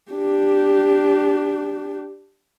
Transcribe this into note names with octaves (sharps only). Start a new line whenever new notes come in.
D4 G4